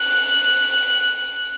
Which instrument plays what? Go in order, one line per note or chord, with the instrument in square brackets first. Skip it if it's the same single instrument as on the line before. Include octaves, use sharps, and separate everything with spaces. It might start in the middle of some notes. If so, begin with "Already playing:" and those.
Already playing: [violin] F#6